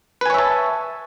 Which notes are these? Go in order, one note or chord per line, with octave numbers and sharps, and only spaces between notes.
B4 C#5 E5 G#5 A5